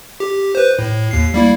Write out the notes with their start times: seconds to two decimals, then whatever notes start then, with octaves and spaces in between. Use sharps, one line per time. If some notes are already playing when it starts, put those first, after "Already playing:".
0.20 G4
0.55 B4 C5
0.79 A2
1.11 D#2 C7
1.34 G3 A#3 E4